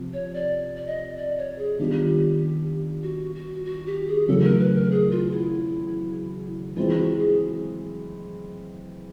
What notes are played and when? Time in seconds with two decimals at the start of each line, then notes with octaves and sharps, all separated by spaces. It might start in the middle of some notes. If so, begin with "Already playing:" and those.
Already playing: C3 F3
0.13 C#5
0.34 D5
0.76 D5
0.86 D#5
1.17 D5
1.38 C#5
1.58 G#4
1.79 D#3 G3 B3 D4 F4 G4
3.03 F#4
3.35 F#4
3.65 F#4
3.87 G4
4.07 G#4
4.28 E2 C#3 F#3 A3 A4
4.43 A#4
4.60 B4
4.74 A#4
4.91 G#4
5.11 F4
5.32 E4
6.76 E3 G#3 C4 F4
6.98 F#4
7.18 G#4